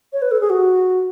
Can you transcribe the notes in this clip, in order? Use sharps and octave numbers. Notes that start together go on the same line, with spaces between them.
C#5
B4
A4
G#4
F#4